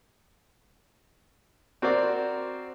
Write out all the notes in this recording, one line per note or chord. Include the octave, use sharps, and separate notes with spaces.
C4 F#4 A#4 C5 D5